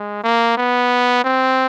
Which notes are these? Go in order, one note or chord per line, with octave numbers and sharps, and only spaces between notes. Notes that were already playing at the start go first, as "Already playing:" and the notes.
Already playing: G#3
A#3
B3
C4